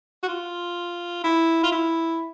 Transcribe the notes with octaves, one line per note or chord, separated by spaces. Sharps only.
F#4
F4
E4
F4
E4